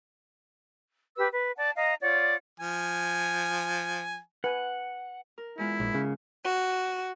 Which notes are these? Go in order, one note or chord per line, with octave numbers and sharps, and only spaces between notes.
G4 B4 E6
B4
D5 F#5 A5
D#5 F5 A#5
F4 C#5 D5 F#5
F3 G#5
B4 F#5 G#5
A#4
E2 G#3 E4 F4
A#1 G#2
C#3
F#4